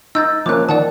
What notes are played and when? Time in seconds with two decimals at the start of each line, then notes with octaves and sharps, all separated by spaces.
0.15 D#4 E6 G6 A6
0.46 F3 A#3 C#4 D6 F#6
0.69 D#3 D5 F#5 A5